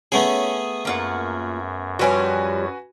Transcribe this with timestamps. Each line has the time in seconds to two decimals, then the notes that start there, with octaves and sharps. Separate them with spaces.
0.12 A3 B3 C#4 G#4 D#6
0.85 F#2 A#3 F4 F#5
1.99 F3 G3 F#4 B4 C#5 G#5